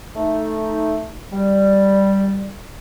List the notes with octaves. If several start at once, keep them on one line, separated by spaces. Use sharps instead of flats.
A3 D#4
G3